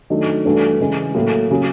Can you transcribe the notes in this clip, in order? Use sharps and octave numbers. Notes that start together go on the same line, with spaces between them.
D#3 F#3 A3 D4
G2 E3 A3 D4 F#4
C#3 E3 G#3
A2 F#3 A#3
C#3 F#3